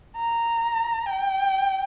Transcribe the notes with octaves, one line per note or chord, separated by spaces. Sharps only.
A#5
G5